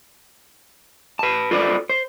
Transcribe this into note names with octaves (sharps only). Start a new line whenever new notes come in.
B4 A5
F4 A4 B4 C5 D5
C5